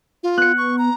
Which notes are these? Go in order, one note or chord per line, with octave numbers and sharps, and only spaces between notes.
F4
B3 F#6 C#7
C#6
A#5